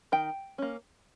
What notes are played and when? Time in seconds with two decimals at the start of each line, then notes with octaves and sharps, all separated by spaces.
0.12 D#3 G5
0.58 A#3 C#4